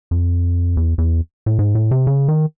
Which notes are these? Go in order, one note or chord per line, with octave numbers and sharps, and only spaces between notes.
F2
E2
E2
A2
G#2
A2
C3
C#3
D#3